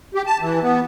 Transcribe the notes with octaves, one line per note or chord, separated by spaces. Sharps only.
G4
A5
E3
B3